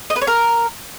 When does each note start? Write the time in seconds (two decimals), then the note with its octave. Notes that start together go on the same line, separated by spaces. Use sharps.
0.10 D#5
0.16 B4
0.22 C#5
0.27 A#4